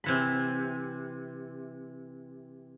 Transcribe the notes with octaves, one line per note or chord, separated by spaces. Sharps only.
C3 E3 B5